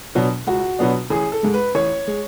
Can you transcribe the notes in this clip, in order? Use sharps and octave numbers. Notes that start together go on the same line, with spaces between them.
B2 F#3 B3 D4
C#2 F#4
B2 F#3 B3 D4
A1 G#4
A4
G#2 G#3
B4
A1 C#5
G#3